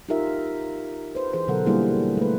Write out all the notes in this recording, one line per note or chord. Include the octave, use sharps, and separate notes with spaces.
D#4 F4 G4 A#4 E5
B4 C5
E3 G#4 C5
B2 D3 F#3 A4 A#4 F#5
G3 A#3 D4 E4 G#4
A3 B4